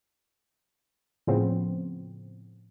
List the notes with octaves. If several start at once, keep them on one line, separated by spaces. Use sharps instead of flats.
A2 C#3 F3 B3 C4